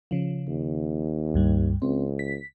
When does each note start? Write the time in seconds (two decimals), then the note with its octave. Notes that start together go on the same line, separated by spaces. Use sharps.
0.11 C#3 F3
0.48 D#2
1.34 C#2 G2 G3
1.82 C#2 C4
2.19 B6